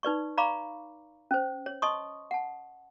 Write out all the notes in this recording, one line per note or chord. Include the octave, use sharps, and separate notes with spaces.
D#4 B4 D5 C#6
D5 F5 A#5 B5 C#6 D6
C#4 C5
C#5
D#5 A5 C6 C#6 D#6
F#5 A5